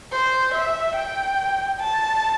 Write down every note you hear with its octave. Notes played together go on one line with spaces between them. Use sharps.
C5
E5
G5
A5